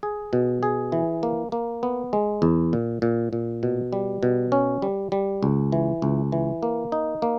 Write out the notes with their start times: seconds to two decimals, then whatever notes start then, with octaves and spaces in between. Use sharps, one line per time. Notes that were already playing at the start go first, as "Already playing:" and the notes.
0.03 G#4
0.33 B2
0.63 G#4
0.92 E3
1.23 A#3
1.52 A#3
1.83 B3
2.13 G#3
2.42 E2
2.73 A#2
3.02 A#2
3.33 A#2
3.63 B2
3.93 G3
4.23 B2
4.52 C#4
4.82 G3
5.12 G3
5.43 C#2
5.72 E3
6.02 C#2
6.32 E3
6.63 A#3
6.92 D#4
7.22 A#3